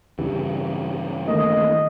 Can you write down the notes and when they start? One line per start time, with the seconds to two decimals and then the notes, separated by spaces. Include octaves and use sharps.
0.19 G2 C#3 E3 G4
1.28 D#3 A3 A#3 D#5